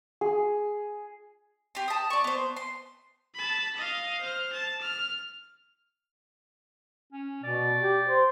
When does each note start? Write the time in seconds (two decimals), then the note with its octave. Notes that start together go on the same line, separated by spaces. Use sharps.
0.21 G#4
1.75 G4 C6
1.88 A5 D#6
2.10 D5 C#6
2.24 B3 C5
2.56 C6
3.34 A5 B5
3.77 D#5 F5
4.21 C5 F6
4.53 A5
4.81 F6
7.13 C#4
7.43 B2 D5
7.80 G4
8.08 C5